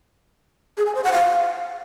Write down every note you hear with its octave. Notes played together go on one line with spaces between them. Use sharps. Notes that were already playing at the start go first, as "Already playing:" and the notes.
G#4
G#5
C5
F#5
F5